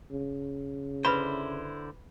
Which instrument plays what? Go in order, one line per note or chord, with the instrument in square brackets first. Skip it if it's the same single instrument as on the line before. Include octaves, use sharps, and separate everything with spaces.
[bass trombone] C#3
[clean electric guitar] D3 E4 C5 [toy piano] B4 E5 B5